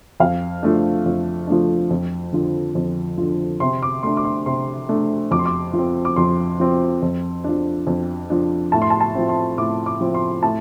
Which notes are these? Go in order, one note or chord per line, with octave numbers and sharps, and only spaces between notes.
F2 F5
F3 A3 D4
F2
F3 A3 D4
F2
D3 F3
F2
D3 F3
C3 C6
D6
A3 D4 C6
D6
C6
C3 C6
A3 D4
F2 D6
C6
D6
F3
C4
D6
F2 C6
F3 C4
F2
F3 D4
F2
F3 D4
A2 A5
C6
A5
A5
F3 C4
C6
A2 D6
D6
F3 C4
C6
A2 A5